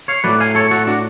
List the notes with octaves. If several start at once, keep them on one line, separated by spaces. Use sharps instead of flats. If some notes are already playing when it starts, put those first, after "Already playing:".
C#5 F5
A2 F#3 A3 B4 D5
F5 G#5
A4 C#5
F#4 A4
D4 F#4